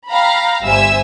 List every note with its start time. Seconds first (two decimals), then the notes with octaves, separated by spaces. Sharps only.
0.11 F5 G5 A#5 B5
0.65 G1 G3 C5 E5 G#5 E6